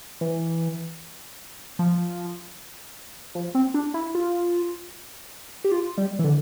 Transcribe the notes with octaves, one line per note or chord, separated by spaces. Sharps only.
E3
F3
F3
C4
D4
E4
F4
G4
F4
G3
E3
D3